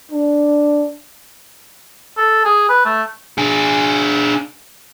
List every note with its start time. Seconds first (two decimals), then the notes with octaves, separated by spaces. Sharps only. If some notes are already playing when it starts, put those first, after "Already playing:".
0.11 D4
2.18 A4
2.45 G#4
2.69 B4
2.85 A3
3.38 D4 G#4